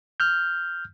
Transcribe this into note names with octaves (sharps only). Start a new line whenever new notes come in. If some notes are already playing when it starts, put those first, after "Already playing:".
F6 G6